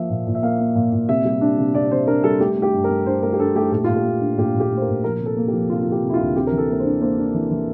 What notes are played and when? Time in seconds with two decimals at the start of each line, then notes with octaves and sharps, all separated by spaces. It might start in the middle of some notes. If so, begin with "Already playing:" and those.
Already playing: F3 A#3 E5
0.10 A#2
0.27 A#2
0.35 E5
0.43 A#3 F5
0.60 A#3
0.75 A#2
0.92 A#2
1.09 C3 E5
1.25 G3
1.41 D4
1.58 C3
1.74 C3 D5
1.91 C3 C5
2.07 D4 A#4
2.24 G3 A4
2.40 A3 G4
2.57 A3
2.62 G4
2.73 G2
2.84 A#4
2.89 A3
3.06 D4 C5
3.23 A3 A#4
3.33 G4
3.40 D4 A4
3.56 A3 G4
3.72 A#2 G4
3.84 A#2 F4
3.96 G4
4.05 A3
4.21 D4
4.38 A#2 G4
4.55 A#2
4.60 G4
4.71 A3
4.77 C5
4.82 A#4
4.88 A#2
5.04 F3 A#4
5.20 C3
5.26 A4
5.37 A#3
5.48 G4
5.53 F3
5.70 C3 F4
5.81 F3 F4
5.92 G4
6.03 C3
6.09 E4
6.14 F4
6.19 D2
6.35 C3 G4
6.47 A#4
6.52 E3
6.58 A4
6.69 A#3 A#4
6.79 C5
6.85 D4
7.01 A#3 C5
7.18 D4
7.34 E3
7.51 E3